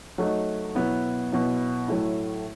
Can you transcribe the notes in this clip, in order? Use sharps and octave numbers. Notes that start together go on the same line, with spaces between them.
F#3 A3 D#4
B2 F#3 B3 E4
B2 F#3 B3 E4
A2 F#3 A3 E4